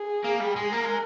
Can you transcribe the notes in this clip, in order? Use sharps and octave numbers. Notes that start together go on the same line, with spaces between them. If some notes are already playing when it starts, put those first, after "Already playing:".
Already playing: G#4
A#3
G3
G#3
A#3 A#4
G#3